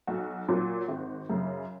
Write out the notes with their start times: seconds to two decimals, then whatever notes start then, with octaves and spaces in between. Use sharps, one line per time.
0.07 B1 F#4
0.49 A#2 F#3
0.88 G#1
1.30 F#2 C#3